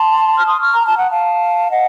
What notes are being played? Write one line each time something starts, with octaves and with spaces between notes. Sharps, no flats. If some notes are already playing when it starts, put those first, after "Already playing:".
Already playing: A5 C6
F6
C6 D#6
C#6 F6
A#5
A5
F#5
F5 A5
D#5 F#5